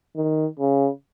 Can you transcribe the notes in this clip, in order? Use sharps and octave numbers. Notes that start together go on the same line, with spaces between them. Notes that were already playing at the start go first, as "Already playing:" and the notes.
D#3
C#3